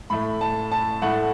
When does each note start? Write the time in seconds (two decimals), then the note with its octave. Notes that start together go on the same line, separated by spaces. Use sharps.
0.10 A2 A3 B5
0.41 A5
0.72 A5
1.02 A2 A3 F#5